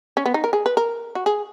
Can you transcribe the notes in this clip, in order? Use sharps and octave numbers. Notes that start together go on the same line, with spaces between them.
C#4
B3
D#4
A#4
G#4
B4
A#4
F#4
G#4